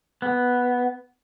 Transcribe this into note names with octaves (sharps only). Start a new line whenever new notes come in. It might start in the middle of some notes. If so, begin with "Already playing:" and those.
B3